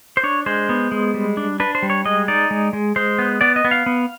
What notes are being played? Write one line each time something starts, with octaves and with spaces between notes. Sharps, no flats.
C5
D4 C#5
G#3 C5
B3
G#3
G3
D4
D4 B4
C5
G3
C#5
G#3 D#5
D#4 D5
G#3
G#3
G#3 C5
B3
B3 D5
D#5
B3
F5
B3